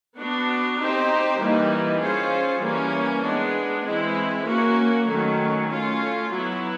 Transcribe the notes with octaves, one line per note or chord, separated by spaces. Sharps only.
B3 D4 F#4
C4 D#4 G4 C5
E3 G3 A#3 D#4
C#4 F4 G#4 C5
E3 G3 A#3 C#4
G#3 B3 D4
E3 G#3 C4 E4
A#3 C#4 F#4
D#3 F#3 A3 C#4
A3 C#4 F4
F#3 B3 E4